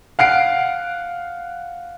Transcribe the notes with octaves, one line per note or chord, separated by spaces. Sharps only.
F5 F#5 C7 D7